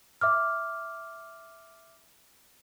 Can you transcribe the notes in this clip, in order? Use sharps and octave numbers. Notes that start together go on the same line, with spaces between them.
E5 D6 F6